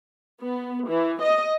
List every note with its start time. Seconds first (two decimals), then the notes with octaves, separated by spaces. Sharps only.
0.41 B3
0.88 E3
1.21 D#5